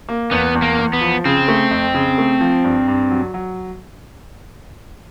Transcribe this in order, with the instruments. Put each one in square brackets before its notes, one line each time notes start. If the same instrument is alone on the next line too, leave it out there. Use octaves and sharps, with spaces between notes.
[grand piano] A#3
[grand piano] E2 [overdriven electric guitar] B3
[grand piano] E2
[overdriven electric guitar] A#3
[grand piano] E2
[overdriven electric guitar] B3
[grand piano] F3
[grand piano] C#3 [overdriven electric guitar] C4
[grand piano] A3
F2
C#3
A3
F3
G2
G2
F#3
F#3